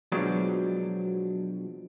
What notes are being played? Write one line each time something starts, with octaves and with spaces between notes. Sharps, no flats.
B2 F3 F#3 G#3 D4